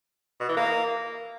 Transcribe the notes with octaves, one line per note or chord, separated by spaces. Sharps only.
B2
E3
A#3